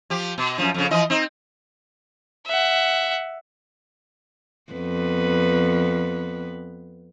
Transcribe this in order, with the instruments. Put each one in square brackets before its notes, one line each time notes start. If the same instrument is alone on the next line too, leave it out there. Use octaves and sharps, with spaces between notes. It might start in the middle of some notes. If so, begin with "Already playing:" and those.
[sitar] F3 G4
B2
F#2 A#2 F3
F2 C#3
E3 F3 D#5
C4 D#4
[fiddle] E5 F#5
[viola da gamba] F2 B3 B4